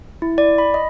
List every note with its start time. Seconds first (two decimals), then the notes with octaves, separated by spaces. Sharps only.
0.22 E4
0.38 D5
0.58 B5
0.74 D#5